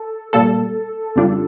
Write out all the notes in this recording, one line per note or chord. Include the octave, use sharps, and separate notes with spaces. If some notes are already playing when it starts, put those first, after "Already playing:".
Already playing: A4
A#2 G3 A#3 A4
F2 C#3 G3 D4 F4